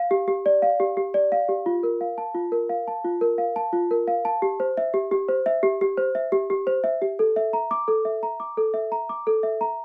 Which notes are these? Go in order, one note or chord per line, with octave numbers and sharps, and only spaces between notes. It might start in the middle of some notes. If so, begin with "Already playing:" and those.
Already playing: F5
G4
G4
D5
F5
G4
G4
D5
F5
G4
F4
A#4
F5
A5
F4
A#4
F5
A5
F4
A#4
F5
A5
F4
A#4
F5
A5
G4
C5
E5
G4
G4
C5
E5
G4
G4
C5
E5
G4
G4
C5
E5
G4
A4
E5
A#5
D6
A4
E5
A#5
D6
A4
E5
A#5
D6
A4
E5
A#5